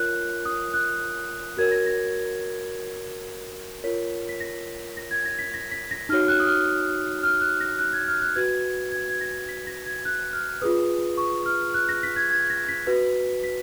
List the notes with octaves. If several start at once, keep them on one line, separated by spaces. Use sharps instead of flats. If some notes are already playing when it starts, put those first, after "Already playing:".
Already playing: F4 A#4 C#5 F#6
D#6
F#6
F#4 A#4 C#5 G#6
A#6
A#6
F4 A#4 C#5 B6
B6
A#6
A#6
G#6
A#6
B6
A#6
B6
A#6
D#4 F#4 C#5 F6
F#6
D#6
F6
F6
F#6
A#6
F#6
G#6
F6
F#6
F#4 B4 G#6
G#6
G#6
A#6
B6
A#6
G#6
F#6
F6
F4 G#4 B4 D#6
C#6
F6
F#6
A#6
B6
G#6
G#6
A#6
B6
F#4 B4
B6